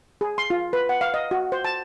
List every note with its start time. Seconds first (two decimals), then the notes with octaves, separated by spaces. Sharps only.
0.21 G#4
0.38 C6
0.50 F4
0.73 B4
0.89 F#5
1.01 F5
1.14 D#5
1.31 F#4
1.52 C5
1.65 A5